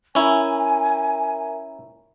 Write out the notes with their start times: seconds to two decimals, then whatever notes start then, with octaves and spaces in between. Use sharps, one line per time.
0.15 C#4 E4 A#4 E5 G#5 A#5